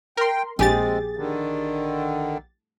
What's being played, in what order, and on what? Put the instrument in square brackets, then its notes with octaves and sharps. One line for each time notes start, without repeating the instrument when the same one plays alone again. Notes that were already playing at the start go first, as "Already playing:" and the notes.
[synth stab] A#4 C6 [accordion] G5
[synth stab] A#1 G4 A6 [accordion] G#3 C4 [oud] G#4
[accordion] D3 D#3